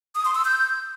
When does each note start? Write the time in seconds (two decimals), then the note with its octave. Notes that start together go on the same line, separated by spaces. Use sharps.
0.15 D#6
0.25 C6
0.35 E6
0.45 G6